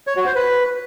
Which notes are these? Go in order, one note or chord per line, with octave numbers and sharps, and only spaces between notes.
C#5
F#4
C5
B4